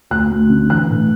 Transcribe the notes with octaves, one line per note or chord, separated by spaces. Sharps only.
D2 F#6
D2
D3
E3 F#6
A2